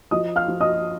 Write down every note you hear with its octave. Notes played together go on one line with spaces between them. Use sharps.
F3 D#5 D#6
F5 F6
F3
D#5 D#6